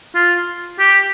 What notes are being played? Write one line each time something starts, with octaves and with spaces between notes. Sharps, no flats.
F4
G4